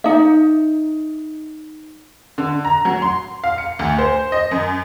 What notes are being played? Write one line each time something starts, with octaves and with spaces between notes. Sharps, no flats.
D#4 E5
D3
A#5
F#3
C6
F5
C#7
D2
C5
D#5
F#2